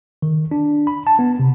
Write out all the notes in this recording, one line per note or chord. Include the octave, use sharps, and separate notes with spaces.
D#3
D4
B5
A5
B3
C3